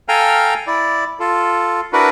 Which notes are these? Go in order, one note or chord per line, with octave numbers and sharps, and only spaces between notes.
A4 F5 G5 G#5 A#5 F6
E4 D5
F4 A4
D4 E4 F#4 A#4 B4